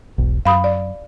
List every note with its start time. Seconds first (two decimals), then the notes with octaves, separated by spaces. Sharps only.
0.18 E1 B1
0.45 F#2 F5 B5 D#6
0.64 D5